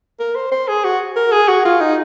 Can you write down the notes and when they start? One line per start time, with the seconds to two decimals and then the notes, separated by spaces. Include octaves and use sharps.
0.20 A#4
0.36 C5
0.52 C5
0.68 G#4
0.85 F#4
1.16 A#4
1.32 G#4
1.48 F#4
1.65 F4
1.81 D#4